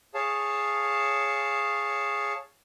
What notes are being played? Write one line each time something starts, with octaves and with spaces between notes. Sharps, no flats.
G#4 C#5 F5 A5